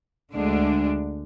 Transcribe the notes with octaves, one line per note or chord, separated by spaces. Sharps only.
D2 D3 G#3 D4